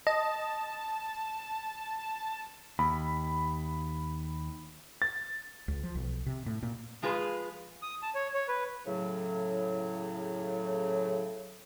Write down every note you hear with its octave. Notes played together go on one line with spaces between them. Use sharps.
D#5 A5
D#2 B5
A6
C#2
F3
B1
C3
A2
A#2
F3 G#3 F4 G#4 B4
D#6
A5
C#5
C#5
B4
A2 C#3 F#3